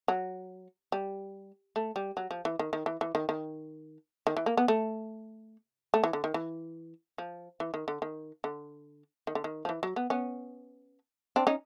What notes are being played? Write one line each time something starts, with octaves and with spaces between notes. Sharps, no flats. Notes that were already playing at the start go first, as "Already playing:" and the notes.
F#3
G3
A3
G3
F#3
F3
E3
D#3
D#3
E3
E3
D#3
D#3
D#3
E3
A#3
B3
A3
A3
E3
D3
D#3
E3
F3
E3
D#3
D3
D#3
D3
D#3
D3
D#3
F3
E3
F#3
B3
B3 C#4
C4 D4
C#4 D#4